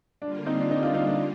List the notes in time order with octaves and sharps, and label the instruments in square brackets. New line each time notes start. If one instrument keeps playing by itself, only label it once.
[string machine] D3 G3 A#3 F4 [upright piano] D4
[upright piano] C4 D#4
D4
C4 D#4
D4 F4
C4 D#4
D4